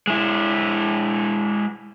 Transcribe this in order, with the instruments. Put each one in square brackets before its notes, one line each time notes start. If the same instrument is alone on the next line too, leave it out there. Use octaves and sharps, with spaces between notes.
[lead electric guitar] G#3 E4